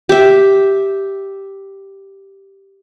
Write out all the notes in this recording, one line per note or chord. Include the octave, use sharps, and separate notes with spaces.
G4 E5